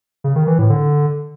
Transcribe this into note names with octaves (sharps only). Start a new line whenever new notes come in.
C#3
D#3
E3
A2
D3